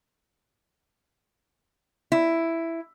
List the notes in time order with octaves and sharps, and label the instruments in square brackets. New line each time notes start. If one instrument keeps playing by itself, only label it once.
[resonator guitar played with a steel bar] E4